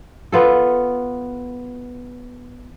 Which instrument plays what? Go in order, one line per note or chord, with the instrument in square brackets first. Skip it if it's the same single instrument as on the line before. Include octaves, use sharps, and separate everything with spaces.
[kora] B3 F4 A4